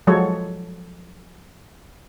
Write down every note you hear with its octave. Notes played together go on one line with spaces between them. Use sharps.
F3 F#3 G#3 A4 C#5